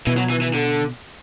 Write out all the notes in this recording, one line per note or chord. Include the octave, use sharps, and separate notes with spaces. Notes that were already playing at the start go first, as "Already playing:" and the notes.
B2 E3
F#3
E3
E3
D3